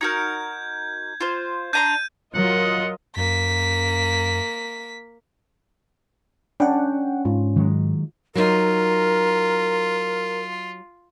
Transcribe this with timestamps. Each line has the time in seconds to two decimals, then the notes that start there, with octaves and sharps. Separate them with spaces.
0.01 D#4 F#4 A#4 G6 G#6
1.21 F4 C5
1.73 D4 A#5 C6 G6 D#7
2.35 F#3 F4 A#4 D#5 F#5
3.16 F#2 A#3 B6
6.60 C#4 D4 F#5 G5
7.25 G#2 F4
7.56 D#3 F#3 G#3
8.35 F#3 D#4 F4 A#4